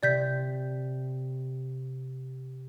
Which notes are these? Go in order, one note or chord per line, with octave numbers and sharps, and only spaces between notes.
C3 D5 G6 B6